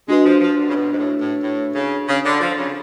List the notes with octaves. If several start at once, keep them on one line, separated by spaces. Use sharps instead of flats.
G#3 D4 F#4 B4
F3
F3
D3
C#3
B2
G#2
A2
A2
A2
C#3
C#3
D3
F3
C#3